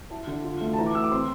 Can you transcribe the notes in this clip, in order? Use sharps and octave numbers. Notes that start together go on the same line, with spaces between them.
E4 A5
D3
F4
A3
A5
E3 A#5
D6
A3 E6
D6
C4 C6